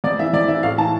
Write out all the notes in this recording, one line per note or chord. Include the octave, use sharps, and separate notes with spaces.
F2 D5
E3 E5
F2 D5
E3 E5
A2 F5
E3 A5